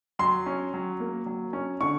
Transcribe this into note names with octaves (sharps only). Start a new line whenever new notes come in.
F#3 C6
C#4
F#3
A#3
F#3
C#4
D3 C#6